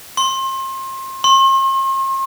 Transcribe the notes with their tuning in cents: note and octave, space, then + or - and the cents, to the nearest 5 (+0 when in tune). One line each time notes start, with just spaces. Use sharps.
C6 +30
C6 +45